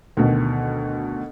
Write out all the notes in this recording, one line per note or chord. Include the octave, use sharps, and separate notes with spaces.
D2 B2 D#3